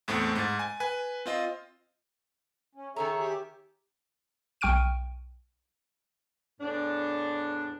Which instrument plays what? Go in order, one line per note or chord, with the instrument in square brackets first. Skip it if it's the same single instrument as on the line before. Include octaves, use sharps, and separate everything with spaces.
[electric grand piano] E2 A2 A3 C4
G#2 A6
G#5
B4 G#5
C4 F4 D#5
[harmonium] C#4
[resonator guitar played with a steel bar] D#3 G#5 A#5 [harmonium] G#4 C#5 E5 [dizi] A4
[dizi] G4
[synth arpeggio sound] B1 G5 C#6 F6 D7 D#7
[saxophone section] E2 A2 D4